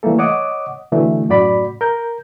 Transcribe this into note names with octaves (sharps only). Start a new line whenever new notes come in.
E3 G3 A3 A#3 A4
C#5 D#5 F#5 D6 D#6
B2 D3 E3 A3
F#2 A2 F#4 D5 B5
A#4 G6